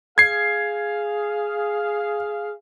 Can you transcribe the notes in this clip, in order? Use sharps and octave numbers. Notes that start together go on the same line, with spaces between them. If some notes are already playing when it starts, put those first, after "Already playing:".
G#4 F5 G#6 C7